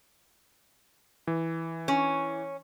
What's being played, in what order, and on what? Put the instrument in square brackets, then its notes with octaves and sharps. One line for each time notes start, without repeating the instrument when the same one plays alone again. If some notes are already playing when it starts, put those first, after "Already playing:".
[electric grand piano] E3
[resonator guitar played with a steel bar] C#4